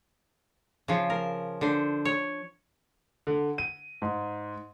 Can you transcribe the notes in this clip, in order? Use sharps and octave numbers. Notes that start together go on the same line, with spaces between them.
C#3 F3
A#4
D3 C5
C#5
D3
D#7
G#2